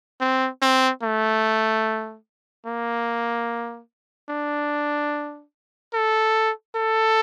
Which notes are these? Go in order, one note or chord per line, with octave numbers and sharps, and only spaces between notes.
C4
C4
A3
A#3
D4
A4
A4